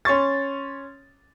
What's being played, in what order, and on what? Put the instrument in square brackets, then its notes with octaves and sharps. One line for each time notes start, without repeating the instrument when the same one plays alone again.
[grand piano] C#4 C6 C#6 A6